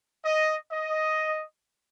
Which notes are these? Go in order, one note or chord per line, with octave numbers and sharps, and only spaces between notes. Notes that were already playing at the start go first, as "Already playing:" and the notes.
D#5
D#5